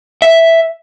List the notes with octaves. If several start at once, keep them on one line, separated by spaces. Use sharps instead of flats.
E5